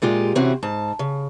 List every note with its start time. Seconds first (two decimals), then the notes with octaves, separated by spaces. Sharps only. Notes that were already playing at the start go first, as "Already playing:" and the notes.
0.02 A#2 G#3 F4 G4
0.35 C3 E3 C4 C#4 E4 F#4
0.63 G#2 A5
0.99 C#3